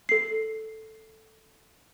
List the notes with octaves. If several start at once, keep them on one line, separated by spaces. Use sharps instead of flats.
A4 C7